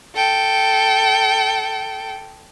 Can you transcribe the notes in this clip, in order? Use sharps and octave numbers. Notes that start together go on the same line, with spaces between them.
A4 G5